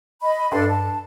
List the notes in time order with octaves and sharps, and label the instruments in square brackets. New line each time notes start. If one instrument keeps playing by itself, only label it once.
[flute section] D#5 B5
[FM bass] G2 [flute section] D4 A4 C6
[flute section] A5